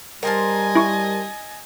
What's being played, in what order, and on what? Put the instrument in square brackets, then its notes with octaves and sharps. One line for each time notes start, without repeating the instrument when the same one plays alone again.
[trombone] G3 [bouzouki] A#4 C5 A5 [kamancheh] D#5 G#5
[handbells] E4 C#6